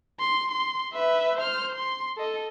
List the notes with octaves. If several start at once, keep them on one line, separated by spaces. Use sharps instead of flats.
C6
C6
B4 E5
C5 F6
C6
A4 D#5